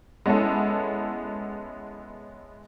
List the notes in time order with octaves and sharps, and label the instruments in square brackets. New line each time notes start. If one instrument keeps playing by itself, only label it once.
[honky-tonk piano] G#3 B3 C#4 E4 A4